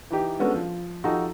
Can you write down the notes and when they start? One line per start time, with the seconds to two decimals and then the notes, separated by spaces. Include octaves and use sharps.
0.10 E3 D#4 G4
0.39 G#3 B3 C#4 D4 F#4 A4
0.54 F3
1.04 F3 D#4 F#4 G4 A4 D#5